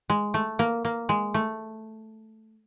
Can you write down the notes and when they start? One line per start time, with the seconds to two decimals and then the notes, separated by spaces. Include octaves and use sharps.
0.10 G#3
0.34 A3
0.59 A#3
0.85 A#3
1.09 G#3
1.34 A3